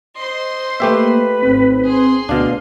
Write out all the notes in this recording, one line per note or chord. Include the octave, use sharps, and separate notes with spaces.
C5 D#5 C6
A3 A#3 G4 B4 E5
G#1 C4
G#4 C6
D2 B2 D4 F5